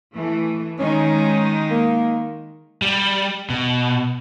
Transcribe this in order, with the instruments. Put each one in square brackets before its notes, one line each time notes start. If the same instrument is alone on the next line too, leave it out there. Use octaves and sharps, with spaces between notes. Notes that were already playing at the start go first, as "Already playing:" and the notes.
[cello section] E3 A3
[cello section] D#3 G#3 D#4 [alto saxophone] C#4
[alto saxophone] A#3
[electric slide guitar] G3
B2